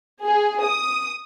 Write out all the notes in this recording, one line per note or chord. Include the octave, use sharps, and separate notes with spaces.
G#4
D#6